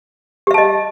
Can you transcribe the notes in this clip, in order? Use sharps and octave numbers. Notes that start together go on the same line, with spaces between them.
G4 D#5 E5 A5